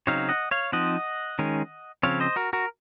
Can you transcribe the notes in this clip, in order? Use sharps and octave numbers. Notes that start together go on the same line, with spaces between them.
C#3 F#3 C4 D#4 C#5 F5
D#5 F#5
C#5 F5
F3 C4 D#4 D#5 F#5
D#3 G#3 C#4
C#3 F3 C4 C#5 F5
C5 D#5
F#4 A#4
F#4 A#4